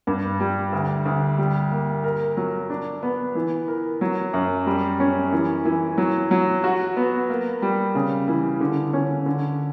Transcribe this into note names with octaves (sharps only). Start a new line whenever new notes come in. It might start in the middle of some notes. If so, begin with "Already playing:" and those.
G2
G3
D2
D2
G3
A#3
A#4
F#3
D4
B3
E3
A#4
F#3
F#2
G3
C#4
E3
E3
F#3
F#3
F#4
B3
A#3
G3
C#3
E3
D3
C#4
D3